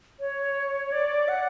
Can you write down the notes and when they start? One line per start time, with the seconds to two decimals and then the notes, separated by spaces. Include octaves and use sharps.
0.20 C#5
0.92 D5
1.28 F#5